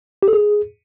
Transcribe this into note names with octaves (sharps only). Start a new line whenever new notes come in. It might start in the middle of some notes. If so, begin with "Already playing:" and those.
G4
A4
G#4